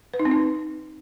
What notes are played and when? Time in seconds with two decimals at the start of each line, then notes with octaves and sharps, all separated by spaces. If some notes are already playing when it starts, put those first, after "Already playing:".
0.14 B4
0.19 D#4
0.25 C4
0.31 D#4